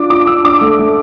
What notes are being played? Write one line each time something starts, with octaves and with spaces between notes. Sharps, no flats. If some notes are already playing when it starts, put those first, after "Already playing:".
Already playing: D4 F4 D6
F4 D6
D4 E6
D4 D6
A3
A3